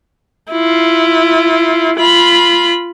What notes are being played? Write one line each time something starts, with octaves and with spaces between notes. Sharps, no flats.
E4 F4
F4 B5